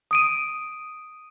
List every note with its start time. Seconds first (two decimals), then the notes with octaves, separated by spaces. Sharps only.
0.11 D#6 D7 D#7